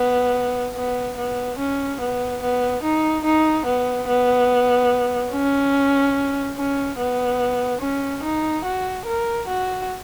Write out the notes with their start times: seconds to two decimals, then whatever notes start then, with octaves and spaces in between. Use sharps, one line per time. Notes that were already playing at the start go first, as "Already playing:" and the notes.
Already playing: B3
0.76 B3
1.17 B3
1.58 C#4
2.00 B3
2.42 B3
2.83 D#4
3.24 D#4
3.66 B3
4.07 B3
5.32 C#4
6.57 C#4
6.98 B3
7.81 C#4
8.23 D#4
8.65 F#4
9.06 A#4
9.48 F#4